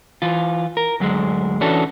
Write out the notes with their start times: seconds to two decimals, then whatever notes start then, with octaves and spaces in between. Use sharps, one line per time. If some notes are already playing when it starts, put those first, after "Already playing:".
0.22 E3 F4
0.77 A#4
1.00 D2 F#3 G#3
1.61 E3 C#4 D4 F#4 A4